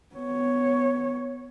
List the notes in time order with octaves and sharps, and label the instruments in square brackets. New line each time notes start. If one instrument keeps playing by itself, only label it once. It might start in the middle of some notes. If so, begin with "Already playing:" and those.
[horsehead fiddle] B3 C#5